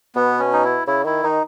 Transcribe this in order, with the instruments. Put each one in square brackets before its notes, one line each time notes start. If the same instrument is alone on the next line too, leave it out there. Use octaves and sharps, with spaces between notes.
[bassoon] B2 [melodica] B3
[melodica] C#4
D#4
E4
[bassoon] C#3 [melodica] E4
[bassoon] D#3 [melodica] E4
[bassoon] D#3 [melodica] D#4